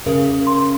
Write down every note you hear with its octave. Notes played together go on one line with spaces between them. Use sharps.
C#3 A#4
C6